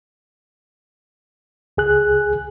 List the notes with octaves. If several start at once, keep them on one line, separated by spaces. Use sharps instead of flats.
C#2 G#4 F#6